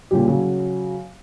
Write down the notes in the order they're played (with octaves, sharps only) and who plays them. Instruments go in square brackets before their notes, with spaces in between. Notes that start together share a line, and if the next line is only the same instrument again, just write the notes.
[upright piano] A#2 C#3 G3 G4
C#3 F#3